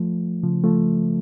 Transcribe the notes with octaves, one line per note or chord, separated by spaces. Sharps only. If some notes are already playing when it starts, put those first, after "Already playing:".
Already playing: F3 A3
C#3 F3
F3 A3